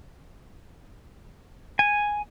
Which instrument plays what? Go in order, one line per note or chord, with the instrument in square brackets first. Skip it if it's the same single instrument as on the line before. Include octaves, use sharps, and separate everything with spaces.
[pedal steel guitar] G#5